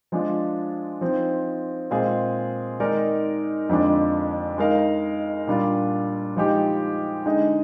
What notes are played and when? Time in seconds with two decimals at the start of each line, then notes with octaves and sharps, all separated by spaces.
0.12 F3 G#3 D4 F4
1.01 F3 C4 D#4
1.91 A#2 G#3 C4 F4 G#4
2.80 D#3 G#3 D#4 A#4 D5
3.69 F2 D3 F3 G#3 D4
4.58 G#3 D#4 A#4 F5
5.47 A#2 G3 D4 F4
6.36 F3 G#3 D#4 G4
7.25 D3 G#3 D#4 G#4 D#5